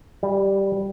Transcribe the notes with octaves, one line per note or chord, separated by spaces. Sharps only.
G3